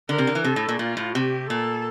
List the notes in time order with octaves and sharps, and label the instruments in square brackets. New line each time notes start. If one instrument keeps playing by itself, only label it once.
[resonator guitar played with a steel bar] D3 [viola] A#4
[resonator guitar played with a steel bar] C3
D3
E3
[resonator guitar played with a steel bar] C3 [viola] A4
[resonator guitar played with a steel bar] A2
A#2
[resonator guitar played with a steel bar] A#2 [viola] F4
[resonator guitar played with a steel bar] A2
[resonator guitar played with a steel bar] C3 [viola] G4
[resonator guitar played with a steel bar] A#2 [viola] A4